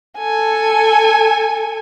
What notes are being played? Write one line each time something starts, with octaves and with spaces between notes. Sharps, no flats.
A4 G#5